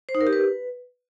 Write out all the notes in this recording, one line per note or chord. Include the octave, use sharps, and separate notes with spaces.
C5
D#4
A#4
G4
B4